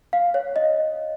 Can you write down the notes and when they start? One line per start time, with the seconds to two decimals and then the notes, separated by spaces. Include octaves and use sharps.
0.13 F5
0.34 C#5
0.56 D#5